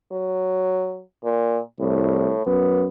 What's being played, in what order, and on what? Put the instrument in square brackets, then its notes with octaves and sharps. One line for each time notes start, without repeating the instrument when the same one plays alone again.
[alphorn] F#3
A#2
[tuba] C2 [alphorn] A2
[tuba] F#2 [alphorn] B3